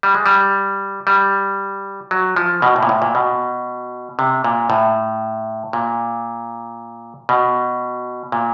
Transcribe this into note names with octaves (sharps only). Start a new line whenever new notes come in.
G3
G#3
G3
G3
F#3
F3
B2
A2
A#2
A2
A#2
B2
C3
A#2
A2
A#2
B2
A#2